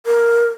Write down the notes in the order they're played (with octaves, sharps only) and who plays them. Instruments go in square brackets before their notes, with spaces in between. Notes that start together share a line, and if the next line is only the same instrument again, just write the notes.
[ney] A#4